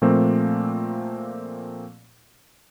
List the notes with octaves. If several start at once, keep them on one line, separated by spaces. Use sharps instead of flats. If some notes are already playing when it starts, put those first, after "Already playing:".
A#2 F3 A3 A#3 C4